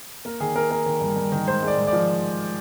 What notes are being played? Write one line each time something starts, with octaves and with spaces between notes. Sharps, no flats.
A#3 A#4
D#3 G#4
A#3 A#4
A#3 A#4
D#3
G2
G2
D#3
G#2 C5
G#3 D5
G#2
D5
F3